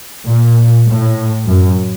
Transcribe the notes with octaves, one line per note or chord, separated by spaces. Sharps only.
A#2
A2
F#2